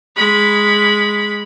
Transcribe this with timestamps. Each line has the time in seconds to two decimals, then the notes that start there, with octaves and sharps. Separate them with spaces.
0.17 G#3 B5